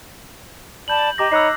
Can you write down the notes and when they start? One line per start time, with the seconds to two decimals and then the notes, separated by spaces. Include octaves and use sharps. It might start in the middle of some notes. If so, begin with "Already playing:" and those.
0.88 D5 A5 B5 G6 F#7
1.18 G4 D#5 A#5 D6 A#6
1.32 D#4 C#5 B5 E6 F#6 C7